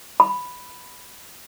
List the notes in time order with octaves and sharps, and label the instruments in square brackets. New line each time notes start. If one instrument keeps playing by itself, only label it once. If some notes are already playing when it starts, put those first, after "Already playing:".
[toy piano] B5